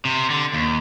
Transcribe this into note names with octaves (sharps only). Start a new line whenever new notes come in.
C3
D3
D#2